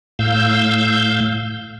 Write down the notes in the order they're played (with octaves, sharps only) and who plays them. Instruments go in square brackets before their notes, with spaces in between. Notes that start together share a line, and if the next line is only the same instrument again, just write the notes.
[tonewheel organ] A2 F5 E6 G6